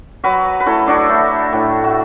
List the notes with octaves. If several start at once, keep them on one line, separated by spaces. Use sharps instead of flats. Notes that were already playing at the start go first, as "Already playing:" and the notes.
F#3 F#4 B4
B4
A3 E4 A4
D4 F#4
A3
A2
F#4